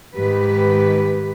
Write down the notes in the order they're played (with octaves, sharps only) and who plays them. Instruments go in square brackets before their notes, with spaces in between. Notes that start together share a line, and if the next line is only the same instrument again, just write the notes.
[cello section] G#2 D#3 B4 [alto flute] G4